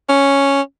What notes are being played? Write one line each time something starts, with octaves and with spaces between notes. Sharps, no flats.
C#4